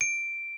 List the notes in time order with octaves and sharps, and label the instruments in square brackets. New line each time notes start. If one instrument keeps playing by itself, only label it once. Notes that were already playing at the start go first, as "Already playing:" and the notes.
[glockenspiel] D7